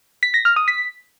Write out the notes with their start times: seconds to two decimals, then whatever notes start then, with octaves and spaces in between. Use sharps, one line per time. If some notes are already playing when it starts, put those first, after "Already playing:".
0.23 B6
0.34 A#6
0.45 F6
0.56 D#6
0.68 B6